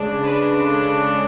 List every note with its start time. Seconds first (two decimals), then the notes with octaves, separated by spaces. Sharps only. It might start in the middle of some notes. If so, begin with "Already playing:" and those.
Already playing: C#3 G#3 D4
0.25 B4
0.63 A4